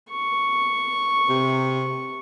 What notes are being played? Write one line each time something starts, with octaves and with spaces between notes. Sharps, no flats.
C#6
C3